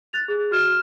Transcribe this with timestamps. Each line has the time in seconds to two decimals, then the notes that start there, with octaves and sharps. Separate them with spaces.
0.13 F#6 A6 F7
0.28 G#4
0.51 F#4 F6 G#6 E7